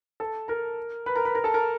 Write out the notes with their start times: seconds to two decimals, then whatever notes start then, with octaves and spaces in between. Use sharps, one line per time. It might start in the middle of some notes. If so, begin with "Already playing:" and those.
0.20 A4 A5
0.48 A#4 A#5
1.06 B4 B5
1.16 A#4 A#5
1.25 B4 B5
1.35 A#4 A#5
1.44 A4 A5
1.54 A#4 A#5